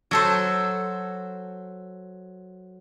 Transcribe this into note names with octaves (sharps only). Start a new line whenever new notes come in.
F#3 A4 C5